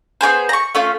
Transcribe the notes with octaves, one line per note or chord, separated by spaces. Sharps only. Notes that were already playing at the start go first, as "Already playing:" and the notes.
B3 D4 G#4 C5
A#5 C#6
A3 C#4 F4